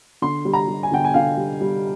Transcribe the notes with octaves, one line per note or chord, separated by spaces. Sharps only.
D3 C6
G3
A#5
G3
G#5
D3 G5
G#5
D3 F5
G3
G3